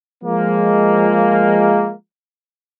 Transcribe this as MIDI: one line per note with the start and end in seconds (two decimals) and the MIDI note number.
0.23 1.93 53
0.23 1.93 56
0.23 1.93 58